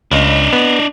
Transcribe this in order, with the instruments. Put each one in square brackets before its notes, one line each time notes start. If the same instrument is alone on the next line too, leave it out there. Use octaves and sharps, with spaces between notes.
[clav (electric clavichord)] C#2 [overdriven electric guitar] D4 D#5
[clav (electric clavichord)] B3